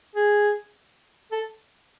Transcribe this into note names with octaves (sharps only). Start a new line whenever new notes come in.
G#4
A4